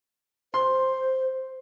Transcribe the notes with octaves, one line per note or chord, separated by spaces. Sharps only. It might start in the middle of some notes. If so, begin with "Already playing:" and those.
C5 C6